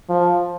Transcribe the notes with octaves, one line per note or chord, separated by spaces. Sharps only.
F3